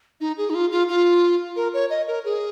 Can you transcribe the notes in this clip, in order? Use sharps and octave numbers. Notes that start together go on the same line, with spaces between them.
D#4
G#4
D#4
F4
F4
F4
A#4
C#5
D#5
A#4
G#4